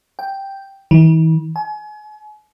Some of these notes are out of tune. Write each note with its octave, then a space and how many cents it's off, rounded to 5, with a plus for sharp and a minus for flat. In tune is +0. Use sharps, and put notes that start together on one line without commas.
G5 +0
E3 -45
G#5 +40